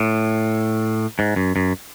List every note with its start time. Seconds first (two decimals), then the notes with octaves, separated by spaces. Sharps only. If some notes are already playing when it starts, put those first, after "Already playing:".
Already playing: A2
1.19 G#2
1.36 F#2
1.56 F#2